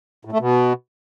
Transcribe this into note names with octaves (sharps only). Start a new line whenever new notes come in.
A2
A3
B2